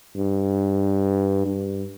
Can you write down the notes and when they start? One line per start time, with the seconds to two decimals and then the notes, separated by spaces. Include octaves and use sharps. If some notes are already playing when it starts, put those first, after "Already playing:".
0.17 G2
1.45 G2